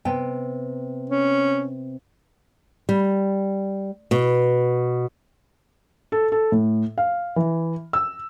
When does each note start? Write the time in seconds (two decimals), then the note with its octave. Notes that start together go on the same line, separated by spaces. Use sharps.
0.05 C3 B3 G5
1.09 C#4
2.89 G3
4.11 B2
6.12 A4
6.32 A4
6.52 A2
6.98 F5
7.36 E3
7.93 E6